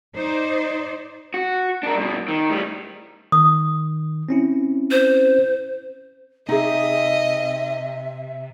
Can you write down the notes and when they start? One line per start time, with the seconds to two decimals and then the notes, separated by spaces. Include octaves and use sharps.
0.15 D#4 C5 D5
1.34 F#4
1.83 D4 A#4
1.95 G2 B2
2.28 D#3
2.50 A2 G3
3.32 D#3 D#6
4.29 C4 C#4 E4
4.91 C5
6.49 C3 D#4 G#4 D#5 E5